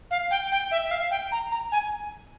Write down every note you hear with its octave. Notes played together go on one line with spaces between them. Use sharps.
F5
G5
G5
E5
E5
F5
G5
A#5
A#5
G#5